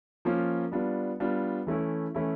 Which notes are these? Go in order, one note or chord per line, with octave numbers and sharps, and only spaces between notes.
F3 A#3 C#4 F4
G3 B3 D4 F4
G3 B3 D4 F4
E3 A3 C#4 E4
E3 A3 C#4 E4